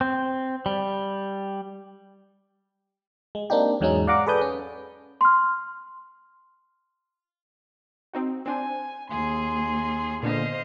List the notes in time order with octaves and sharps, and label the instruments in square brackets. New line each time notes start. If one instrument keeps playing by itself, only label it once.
[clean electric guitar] C4
G3
[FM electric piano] G#3
A#3 C4 D4 D#4 G4
E2 G#2 F#3 G#3 C#4 D#4
D5 F5 F#5 A#5 D6
G#4 A4 B4 D5 D#6 G6
C#4
[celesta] C6 F6
[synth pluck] C4 D#4 F#4
[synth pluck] C4 D4 C5 [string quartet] G#5
[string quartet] D#2 G#4 C6
[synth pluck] A#2 D3 B3 [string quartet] C5 D#5 F5